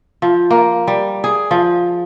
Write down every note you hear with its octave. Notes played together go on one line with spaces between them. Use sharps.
F3
A#3
G3
G#4
F3